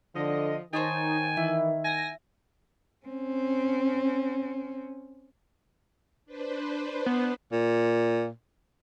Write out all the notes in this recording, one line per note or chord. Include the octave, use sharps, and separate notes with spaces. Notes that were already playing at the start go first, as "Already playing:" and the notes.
D3 F3 D#5
D#3 D#4 C5 C#5 G#5 A5
E3 E4
G#5 A#6
C4 C#4
D4 B4 C5
B3
A#2